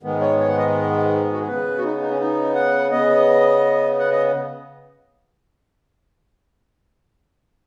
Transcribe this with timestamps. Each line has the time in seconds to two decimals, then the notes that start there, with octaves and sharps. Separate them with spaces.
0.03 G#2 D#3 G#3 B3
0.21 C#5
0.39 C#5
0.48 F#5
0.57 D#5
1.32 F#4
1.40 G#4
1.47 C#3 B3 B4
1.78 F#4
1.84 D#4
2.01 D#4
2.10 C#4
2.20 D#4
2.55 F#5
2.91 C#3 B3 D#5
3.99 F#5
4.12 D#5